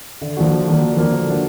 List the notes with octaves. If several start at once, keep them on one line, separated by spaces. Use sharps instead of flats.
D3
F3 A#3 D4 F#4
D3
F3 A#3 D4 F#4
D3
F3 A#3 D4 F#4
D3
F3 A#3 D4 F#4